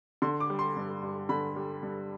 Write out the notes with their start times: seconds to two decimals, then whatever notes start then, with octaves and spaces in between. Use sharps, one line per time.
0.22 D3 C6
0.40 D6
0.50 G3
0.59 C6
0.76 G2
1.03 G2
1.29 D3 B5
1.56 G3
1.83 G2